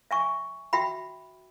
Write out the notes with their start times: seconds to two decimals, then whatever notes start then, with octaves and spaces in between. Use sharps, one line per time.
0.11 E5 G#5 C#6
0.73 F#4 E5 G5 B5